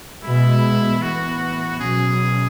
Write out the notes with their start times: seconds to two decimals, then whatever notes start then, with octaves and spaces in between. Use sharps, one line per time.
0.24 B2 G#3 B3 E4
1.02 A2 E3 B3 F#4
1.80 B2 F#3 C#4 G#4